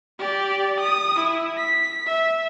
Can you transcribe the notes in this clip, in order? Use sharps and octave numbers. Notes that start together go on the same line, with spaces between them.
G4 D5
D#6
E4
B6
E5